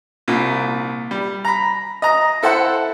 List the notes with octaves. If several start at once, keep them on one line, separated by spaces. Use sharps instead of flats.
C2 A#2
G3
A#5 B5
D#5 A#5
E4 A4 C5 F#5